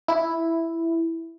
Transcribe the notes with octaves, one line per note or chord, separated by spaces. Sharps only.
E4